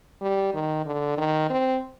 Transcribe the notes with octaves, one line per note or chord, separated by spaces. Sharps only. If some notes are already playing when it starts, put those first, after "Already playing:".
G3
D#3
D3
D#3
C4